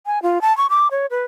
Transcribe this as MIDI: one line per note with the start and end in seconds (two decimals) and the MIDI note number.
0.06 0.22 80
0.22 0.41 65
0.41 0.55 81
0.57 0.67 85
0.70 0.88 86
0.91 1.06 73
1.10 1.24 71